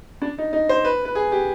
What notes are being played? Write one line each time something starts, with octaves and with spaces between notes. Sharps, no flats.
D4
D#4
D#4
C5
B4
B4
G#4
G4